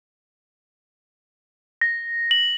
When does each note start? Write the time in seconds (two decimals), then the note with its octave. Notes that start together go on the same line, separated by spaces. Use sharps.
1.81 A#6
2.31 F#7